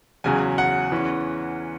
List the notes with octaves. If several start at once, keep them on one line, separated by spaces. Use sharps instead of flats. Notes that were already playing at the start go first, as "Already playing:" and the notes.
E2 C#3 F#3 G#5
F#5
E2 E3 C#4